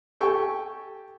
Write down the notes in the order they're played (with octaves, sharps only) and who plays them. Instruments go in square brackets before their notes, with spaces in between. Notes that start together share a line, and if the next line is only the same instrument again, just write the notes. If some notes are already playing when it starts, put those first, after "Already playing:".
[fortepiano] G4 A4 G5 G#5 C#6